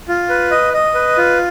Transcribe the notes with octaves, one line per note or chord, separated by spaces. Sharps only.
F4
B4
D#5
D#5
B4
F4